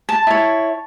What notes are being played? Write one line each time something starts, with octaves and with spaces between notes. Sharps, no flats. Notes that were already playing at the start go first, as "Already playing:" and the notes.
A5
E4 C#5